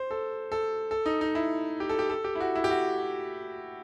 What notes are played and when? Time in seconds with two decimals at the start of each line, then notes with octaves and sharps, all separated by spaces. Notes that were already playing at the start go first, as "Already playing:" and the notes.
Already playing: C5
0.11 A4
0.52 A4
0.91 A4
1.06 D#4
1.21 D#4
1.35 E4
1.80 G4
1.89 A4
1.99 G4
2.10 A4
2.24 G4
2.35 E4
2.40 F#4
2.55 E4
2.64 G4
2.70 F#4